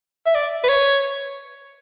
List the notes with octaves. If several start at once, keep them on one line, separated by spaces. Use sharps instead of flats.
E5
D5
B4
C#5